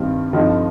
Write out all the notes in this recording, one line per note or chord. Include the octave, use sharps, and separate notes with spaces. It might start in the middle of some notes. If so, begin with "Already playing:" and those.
Already playing: G2 D#3 G3 C4
G2 D3 F3 C4 D#4